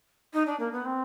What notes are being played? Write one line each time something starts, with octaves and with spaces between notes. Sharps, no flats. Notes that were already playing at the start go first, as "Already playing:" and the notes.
D#4
D4
A#3
B3
C4